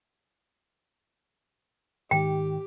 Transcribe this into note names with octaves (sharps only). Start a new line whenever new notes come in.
G#2 D#3 G4 G5